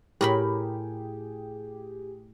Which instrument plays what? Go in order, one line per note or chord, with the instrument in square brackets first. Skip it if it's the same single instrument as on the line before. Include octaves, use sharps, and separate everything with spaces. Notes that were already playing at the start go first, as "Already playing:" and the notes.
[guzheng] A2 A#4 B5 [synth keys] G4 G#4